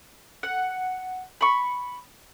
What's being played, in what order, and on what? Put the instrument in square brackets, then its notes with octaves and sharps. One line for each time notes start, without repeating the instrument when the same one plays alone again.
[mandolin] F#5
B5 C#6